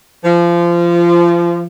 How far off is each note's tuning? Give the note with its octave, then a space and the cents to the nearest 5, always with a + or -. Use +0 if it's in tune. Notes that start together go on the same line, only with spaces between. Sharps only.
F3 -25